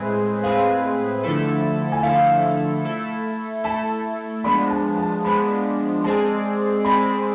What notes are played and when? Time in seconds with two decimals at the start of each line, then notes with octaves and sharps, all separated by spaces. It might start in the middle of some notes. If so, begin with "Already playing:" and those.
Already playing: A2 G#3 C4 G#4 B4
0.43 A2 G#3 C4 G#4 B4 F5
1.23 D3 F3 A3 E4 A4
1.92 G#5
2.03 D3 F3 A3 E4 A4 F5
2.84 A3 E4 A4
3.64 A3 E4 A4 A5
4.44 F3 G#3 B3 D4 B5
4.70 A5
4.97 A5
5.24 F3 G#3 B3 D4 B5
6.04 G#3 C4 G#4 D5 A5
6.84 G#3 C4 G#4 D5 B5